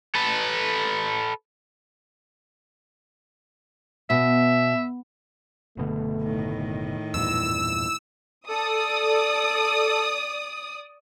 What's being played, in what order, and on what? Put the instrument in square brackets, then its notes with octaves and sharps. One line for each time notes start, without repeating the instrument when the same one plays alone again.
[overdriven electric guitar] A4 B4
[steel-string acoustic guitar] B2 [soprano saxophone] E5
[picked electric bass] F#1 B2 D3 [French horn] A3
[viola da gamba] A2 D#3
[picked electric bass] E2 G2 A#2 [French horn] E4 [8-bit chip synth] E6
[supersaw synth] A4 [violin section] D5 D#6